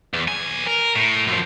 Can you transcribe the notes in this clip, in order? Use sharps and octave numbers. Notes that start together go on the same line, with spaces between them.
E2
B1 G#5
A#4
A2
F#2 F3